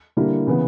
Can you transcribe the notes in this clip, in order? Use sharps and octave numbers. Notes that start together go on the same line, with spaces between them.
D3 G3 A#3 E4
C#3 E3 B3